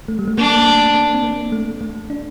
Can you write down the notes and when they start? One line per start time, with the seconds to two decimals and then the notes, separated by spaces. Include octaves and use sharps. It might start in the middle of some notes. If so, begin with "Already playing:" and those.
0.08 A3
0.19 G3
0.28 A3
0.37 A#3 D4
0.66 A3
0.94 A#3
1.14 C4
1.23 A#3
1.52 A3
1.81 A3
2.10 D4